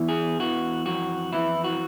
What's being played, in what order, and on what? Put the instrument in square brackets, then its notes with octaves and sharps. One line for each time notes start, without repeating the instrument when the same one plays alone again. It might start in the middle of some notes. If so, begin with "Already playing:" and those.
Already playing: [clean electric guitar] E2 E3
G#4
E3 F#4
F2 F#4
E3 E4
F#4